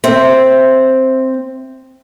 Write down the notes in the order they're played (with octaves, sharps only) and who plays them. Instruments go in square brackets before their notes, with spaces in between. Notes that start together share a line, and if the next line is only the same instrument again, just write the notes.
[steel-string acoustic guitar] C4 C5 E5